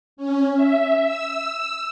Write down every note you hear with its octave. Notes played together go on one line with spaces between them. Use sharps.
C#4
E5
E6